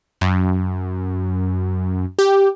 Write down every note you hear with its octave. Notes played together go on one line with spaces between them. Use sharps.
F#2
G4